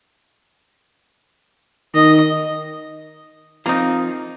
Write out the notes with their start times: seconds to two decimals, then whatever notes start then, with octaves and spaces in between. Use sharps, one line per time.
1.95 D#3 D#5
3.66 F3 A#3 C4 D#4